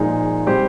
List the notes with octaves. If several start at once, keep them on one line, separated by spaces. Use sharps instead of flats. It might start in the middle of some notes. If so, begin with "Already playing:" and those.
Already playing: A#2 F3 G#3 D#4 G#4
G3 C4 G4 C5